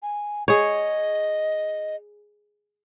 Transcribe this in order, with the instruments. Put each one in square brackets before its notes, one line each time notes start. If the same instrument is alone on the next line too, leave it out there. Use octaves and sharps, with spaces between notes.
[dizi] G#5
[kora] G#4 C#5 [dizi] D#5